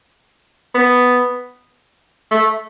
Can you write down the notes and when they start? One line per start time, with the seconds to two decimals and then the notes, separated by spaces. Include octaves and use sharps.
0.75 B3
2.31 A3